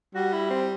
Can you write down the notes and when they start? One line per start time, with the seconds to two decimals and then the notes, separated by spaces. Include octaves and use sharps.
0.15 G3 F#4
0.33 E4
0.50 C4